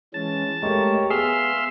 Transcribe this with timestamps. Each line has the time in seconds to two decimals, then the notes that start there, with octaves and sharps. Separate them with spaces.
0.14 E3 G#3 C#4 A5
0.63 G#3 A3 G4 A#4 C#5
1.10 B3 G#4 E5 F5 C6